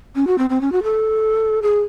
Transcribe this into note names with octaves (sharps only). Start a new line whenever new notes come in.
C#4
F#4
C4
C4
C#4
F#4
A4
G#4